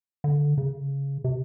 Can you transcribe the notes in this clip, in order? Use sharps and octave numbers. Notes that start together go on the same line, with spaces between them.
D3
C#3
C3